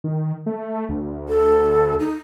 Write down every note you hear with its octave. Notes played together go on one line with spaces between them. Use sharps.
D#3
A3
D2
A4
D#4